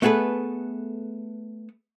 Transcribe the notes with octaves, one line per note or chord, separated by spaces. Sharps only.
A3 B3 G#4 A4 B4